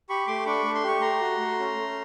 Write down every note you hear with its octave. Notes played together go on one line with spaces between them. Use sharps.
G4 B5 C#6
A3 C6 D6
D4 B5 C#6
A3
C6
G4 C#6
A3 A#5 C6
F#4
A3
C#4
A3